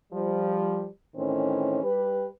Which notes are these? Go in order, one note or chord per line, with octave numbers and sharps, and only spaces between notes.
F3 G3
A2 D#3 E3 C4 C#4
G3 G4 B4